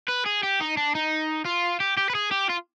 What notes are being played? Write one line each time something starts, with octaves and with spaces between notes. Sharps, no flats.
B4
G#4
G4
D#4
D4
D#4
F4
G4
G4
B4
G#4
G4
F4